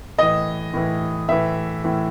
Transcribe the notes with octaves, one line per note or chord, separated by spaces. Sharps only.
A2 E3 D#5
A2 E3
A2 E3 E5
A2 E3